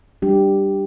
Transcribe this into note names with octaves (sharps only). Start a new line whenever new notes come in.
G3 D4 G4